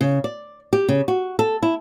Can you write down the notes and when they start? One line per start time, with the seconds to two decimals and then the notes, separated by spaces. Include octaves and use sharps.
0.01 C#3
0.24 D5
0.73 G4
0.89 C#3
1.08 F#4
1.39 A4
1.63 E4